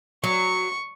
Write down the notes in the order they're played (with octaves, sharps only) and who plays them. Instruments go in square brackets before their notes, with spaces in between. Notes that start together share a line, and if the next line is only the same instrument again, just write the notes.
[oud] F#3 [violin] C#6